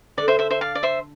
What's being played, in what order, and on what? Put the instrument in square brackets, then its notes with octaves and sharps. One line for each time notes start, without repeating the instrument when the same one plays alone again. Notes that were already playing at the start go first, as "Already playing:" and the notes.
[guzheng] D3 A3 D4 [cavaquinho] D5
[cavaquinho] C5 E5
C5 E5
C5 E5
D5 F5
D5
C5 E5